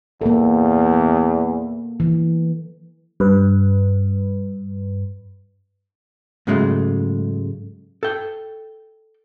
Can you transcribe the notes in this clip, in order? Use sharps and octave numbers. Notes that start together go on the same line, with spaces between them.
E2 A#3 A4
E3
G2 B4
G#2 C#3 F#3 G#3 A3
A4 G5